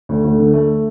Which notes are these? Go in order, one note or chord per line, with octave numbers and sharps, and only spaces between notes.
D2
D2
D3
A3